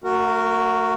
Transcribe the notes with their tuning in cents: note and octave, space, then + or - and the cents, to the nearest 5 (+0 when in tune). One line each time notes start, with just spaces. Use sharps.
A3 +35 F#4 +0 A#4 -15